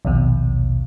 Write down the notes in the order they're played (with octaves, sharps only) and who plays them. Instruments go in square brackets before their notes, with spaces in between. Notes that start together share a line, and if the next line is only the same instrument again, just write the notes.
[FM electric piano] A#1 D#2 B2